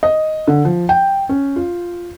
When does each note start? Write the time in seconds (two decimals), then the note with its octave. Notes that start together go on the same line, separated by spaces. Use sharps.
0.03 D#5
0.47 D3
0.65 F3
0.89 G5
1.29 C#4
1.56 F4